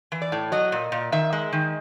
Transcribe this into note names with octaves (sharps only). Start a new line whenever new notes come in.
E3
D5
A2
F#3 D#5
A#2
A#2
D#3 E5
G#3
D#3